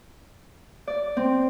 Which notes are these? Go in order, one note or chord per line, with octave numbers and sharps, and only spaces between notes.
D5
C4